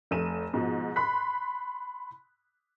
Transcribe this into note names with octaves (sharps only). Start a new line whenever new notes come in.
F1 A3 D#7 E7
G#2 B2 F3
B5 C6 F#6 B6